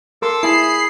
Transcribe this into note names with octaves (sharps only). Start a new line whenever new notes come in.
A4 A#4 C6 D6 E6
E4 G#4 A5 B5 C7